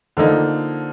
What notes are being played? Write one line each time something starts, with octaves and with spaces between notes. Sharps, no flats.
D3 F3 A#3 D#4